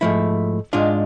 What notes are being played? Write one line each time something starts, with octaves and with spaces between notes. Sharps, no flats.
G#2 F3 A3 E4
G#2 G#3 D4 F4